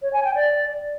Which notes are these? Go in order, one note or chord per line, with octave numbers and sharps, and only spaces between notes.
C#5
G#5
G5
D5